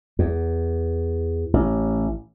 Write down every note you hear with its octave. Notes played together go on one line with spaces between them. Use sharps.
E2
A1